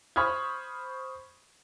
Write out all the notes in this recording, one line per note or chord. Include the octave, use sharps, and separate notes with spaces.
C5 B5 C#6 D#6 F6 G#6